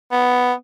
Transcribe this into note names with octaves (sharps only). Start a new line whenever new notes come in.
B3